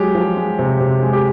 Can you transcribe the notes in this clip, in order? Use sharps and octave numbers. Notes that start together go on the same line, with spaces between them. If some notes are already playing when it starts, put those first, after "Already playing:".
Already playing: F#3 G#3 G4
F3
G#3
C3
C3
G#3
G4